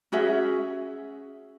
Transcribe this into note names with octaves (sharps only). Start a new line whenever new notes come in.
C#4 F#4 G#4 E5